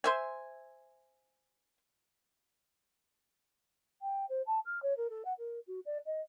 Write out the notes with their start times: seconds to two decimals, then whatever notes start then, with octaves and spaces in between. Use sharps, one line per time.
0.04 C5 E5 G#5
4.00 G5
4.29 C5
4.46 A5
4.65 F6
4.82 C#5
4.97 A#4
5.09 A4
5.25 F#5
5.38 A#4
5.67 F#4
5.86 D5
6.06 D#5